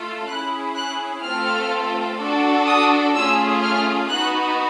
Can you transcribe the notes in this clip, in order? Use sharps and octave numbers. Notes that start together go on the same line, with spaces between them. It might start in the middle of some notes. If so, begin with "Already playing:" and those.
Already playing: A3 F4 A4
C#4 E4 G#4 F#6
F#6
A3 C4 F4 A4 F6
D4 F#4 A4
D#6
A3 C#4 F4 G#4 E6
F6
B3 D#4 F#4 F#6